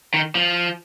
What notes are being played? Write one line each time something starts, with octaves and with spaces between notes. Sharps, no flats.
D#3
F3